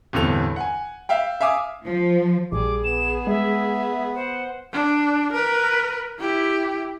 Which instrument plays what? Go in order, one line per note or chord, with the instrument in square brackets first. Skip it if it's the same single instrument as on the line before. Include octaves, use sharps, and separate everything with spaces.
[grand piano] G1 E2 A2 C4 A4 F7
F#5 G#5
E5 F5 G5
E5 F5 G#5 D6 D#6
[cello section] F3
[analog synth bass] A#1 [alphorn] G3 [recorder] G#4 [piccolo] D6
[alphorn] B3 [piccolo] E7
[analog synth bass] G#3 [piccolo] E5
[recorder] C5 [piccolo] F#5
[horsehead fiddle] D4
A#4 B4
E4 G4